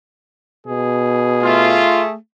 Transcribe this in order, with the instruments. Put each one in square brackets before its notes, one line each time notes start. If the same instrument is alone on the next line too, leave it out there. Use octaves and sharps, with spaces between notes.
[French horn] B2 [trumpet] G#4
[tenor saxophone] A3 [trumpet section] F4